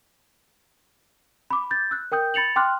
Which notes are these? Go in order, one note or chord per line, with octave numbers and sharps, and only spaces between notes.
B5 D6
G6 A6
E6 F#6
A#4 G5 D#6 G6
B5 A6 C#7 F7 F#7
G5 C6 D6 F6 F#6